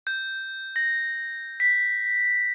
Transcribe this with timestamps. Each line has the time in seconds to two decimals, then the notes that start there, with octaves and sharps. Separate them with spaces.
0.07 G6
0.76 A#6
1.60 B6